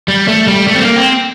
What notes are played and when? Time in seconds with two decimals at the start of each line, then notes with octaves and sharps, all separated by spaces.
0.08 G3
0.28 A3
0.47 G3
0.67 A3
0.75 C4
0.82 A#3
0.96 C4